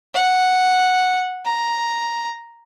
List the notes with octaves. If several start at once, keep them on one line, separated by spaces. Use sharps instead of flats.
F#5
A#5